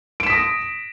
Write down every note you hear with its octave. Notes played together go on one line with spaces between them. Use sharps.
D#6 A#6 B6 D7 E7